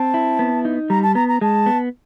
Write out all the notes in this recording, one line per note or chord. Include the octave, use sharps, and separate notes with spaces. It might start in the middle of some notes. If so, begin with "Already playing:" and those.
Already playing: C4 A5
E4
B3
D#4
G3 A#5
A5
B3 A#5
A#5
G#3 A5
B3